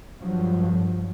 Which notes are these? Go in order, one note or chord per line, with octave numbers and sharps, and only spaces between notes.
G2 F3 F#3